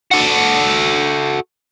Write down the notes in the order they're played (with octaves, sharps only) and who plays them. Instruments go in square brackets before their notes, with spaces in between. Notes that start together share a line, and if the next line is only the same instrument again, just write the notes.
[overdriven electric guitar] F#4 A4